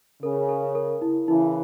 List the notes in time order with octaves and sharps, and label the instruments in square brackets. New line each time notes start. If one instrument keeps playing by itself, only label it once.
[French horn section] C#3 [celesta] A#4
[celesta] A#4
A#4
E4
[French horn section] C#3 E3 [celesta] E4